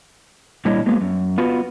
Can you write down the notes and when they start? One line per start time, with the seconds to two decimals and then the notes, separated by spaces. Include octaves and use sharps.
0.65 A#2 G3 D4 E4 C#5 D#5
0.86 F#3 G#3 A#3 B3
1.01 F#2
1.38 B3 F4 F#4 B4